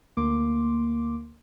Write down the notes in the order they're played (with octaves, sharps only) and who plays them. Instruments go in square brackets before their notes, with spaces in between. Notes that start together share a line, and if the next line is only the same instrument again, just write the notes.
[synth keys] D2 A#3 C6 D6